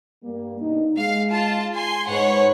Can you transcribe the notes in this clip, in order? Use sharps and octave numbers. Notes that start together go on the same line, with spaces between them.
G2 G3 A#3
B2 D4 D#4
G#3 F5
F4 A5
G#5 C6
G#2 B4 C#5 F#5